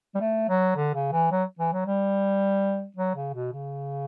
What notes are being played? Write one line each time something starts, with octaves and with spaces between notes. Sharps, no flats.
G3
A3
F#3
D3
C#3
E3
F#3
E3
F#3
G3
F#3
C#3
B2
C#3